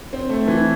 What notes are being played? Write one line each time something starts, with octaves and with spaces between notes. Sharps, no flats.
C4
A3
E3